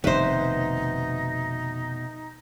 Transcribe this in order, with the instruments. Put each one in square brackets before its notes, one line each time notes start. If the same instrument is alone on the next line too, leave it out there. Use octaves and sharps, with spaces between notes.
[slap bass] F1 D#3 [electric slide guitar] B2 E5 [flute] D#4 [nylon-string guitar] B4 C5